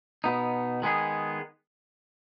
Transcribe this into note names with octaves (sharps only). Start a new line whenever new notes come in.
B2 B3 D#4
D#3 G#3 B3 G#4